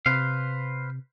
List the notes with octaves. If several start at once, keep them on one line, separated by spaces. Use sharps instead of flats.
C3 B4 C5 F5